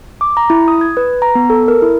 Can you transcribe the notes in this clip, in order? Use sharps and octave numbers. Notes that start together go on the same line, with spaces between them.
D6
A#5
E4
D#6
G#6
B4
A#5
B3
A4
A#4
E4